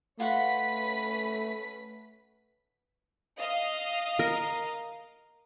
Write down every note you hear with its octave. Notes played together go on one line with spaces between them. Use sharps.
A3 C#4 F4 F#4 B4 F#5 B6
D#5 F5
A#4